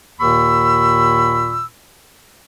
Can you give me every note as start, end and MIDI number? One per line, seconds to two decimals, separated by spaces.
0.19 1.65 39
0.19 1.65 46
0.19 1.65 51
0.19 1.65 83
0.19 1.65 85
0.19 1.65 88